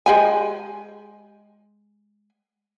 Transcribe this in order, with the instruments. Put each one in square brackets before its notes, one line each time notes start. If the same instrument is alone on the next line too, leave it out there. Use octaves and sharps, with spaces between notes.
[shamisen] G#3 G4 G#5